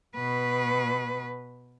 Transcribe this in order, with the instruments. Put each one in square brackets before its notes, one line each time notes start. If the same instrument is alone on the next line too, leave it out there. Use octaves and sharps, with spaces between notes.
[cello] B2 B4